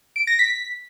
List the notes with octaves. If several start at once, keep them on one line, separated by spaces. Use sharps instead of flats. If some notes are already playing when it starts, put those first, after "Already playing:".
D7
A#6
B6